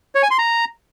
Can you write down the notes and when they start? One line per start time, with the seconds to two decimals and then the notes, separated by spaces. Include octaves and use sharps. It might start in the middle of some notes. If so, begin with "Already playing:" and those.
0.15 C#5
0.23 G#5
0.31 C6
0.39 A#5